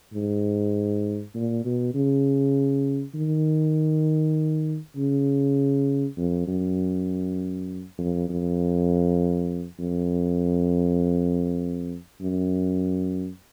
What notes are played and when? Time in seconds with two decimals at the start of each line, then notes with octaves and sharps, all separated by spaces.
0.13 G#2
1.34 A#2
1.65 B2
1.94 C#3
3.15 D#3
4.97 C#3
6.17 F2
6.47 F#2
7.98 F2
8.29 F2
9.78 F2
12.21 F#2